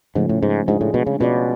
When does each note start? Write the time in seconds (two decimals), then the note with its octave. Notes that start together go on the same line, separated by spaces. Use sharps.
0.15 G#2 C#3 F3 A3 C#4
0.29 A2
0.43 G#2
0.68 G#2 G#3 D4 F4 G#4
0.81 A2
0.94 B2
1.07 C#3
1.20 B2 C#4 F4 G#4 B4 D5